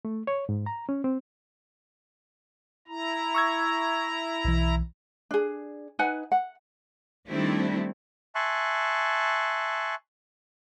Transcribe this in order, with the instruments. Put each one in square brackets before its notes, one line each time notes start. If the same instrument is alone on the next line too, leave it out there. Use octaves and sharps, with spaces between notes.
[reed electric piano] A3
C#5
G#2
A#5
C#4
C4
[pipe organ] E4 A#5
[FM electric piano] C#6 E6 G#6
B1 E3
[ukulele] D4 G#4
D#4 B4 F#5 G#5
F#5
[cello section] D#3 G3 A3 C4 D4 E4
[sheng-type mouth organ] E5 G#5 A5 C6 C#6 F#6